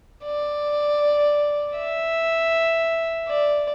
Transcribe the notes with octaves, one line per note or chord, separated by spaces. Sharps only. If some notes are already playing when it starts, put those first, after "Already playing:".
D5
E5
D5